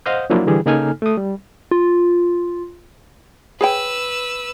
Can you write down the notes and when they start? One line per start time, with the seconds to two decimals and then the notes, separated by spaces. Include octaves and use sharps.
0.06 C5 D#5 F5 F#5 D#6 G6
0.30 F3 F#3 A#3 D4 E4 F4
0.46 D3 E3 G3 G#4
0.66 C#3 A#3 D#4 A4 G#5 F6
1.02 A3 D#6
1.17 G3
1.71 F4
3.61 G#4 B4 C#5 G5 E6